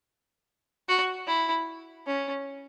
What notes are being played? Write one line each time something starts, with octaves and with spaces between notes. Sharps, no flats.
F#4
E4
C#4